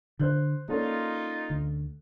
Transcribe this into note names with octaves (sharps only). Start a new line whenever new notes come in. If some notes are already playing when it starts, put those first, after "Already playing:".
D3 C5 F#6 G6
A#3 C#4 D#4 F4 A4 D5
D2